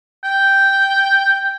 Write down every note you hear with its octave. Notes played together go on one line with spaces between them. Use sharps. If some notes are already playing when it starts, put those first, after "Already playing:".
G5